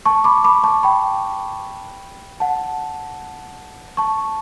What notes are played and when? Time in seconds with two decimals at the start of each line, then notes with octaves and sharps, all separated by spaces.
0.06 A5 C#6
0.24 B5 D6
0.44 B5 D6
0.64 A5 C#6
0.83 G5 B5
2.40 F#5 A5
3.97 A5 C#6